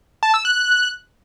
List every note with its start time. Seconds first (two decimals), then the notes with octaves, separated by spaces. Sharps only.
0.23 A5
0.34 E6
0.45 F#6